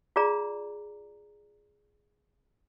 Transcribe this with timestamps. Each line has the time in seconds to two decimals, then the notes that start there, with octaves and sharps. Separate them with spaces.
0.16 F4 G#4 D5 A#5